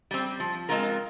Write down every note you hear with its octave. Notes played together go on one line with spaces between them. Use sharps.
G3 C4
F3
G#3 C4 F4 A#4